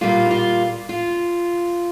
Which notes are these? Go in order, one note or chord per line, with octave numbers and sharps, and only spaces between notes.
A#2 G3 A#3 F4
D#4
F4
F4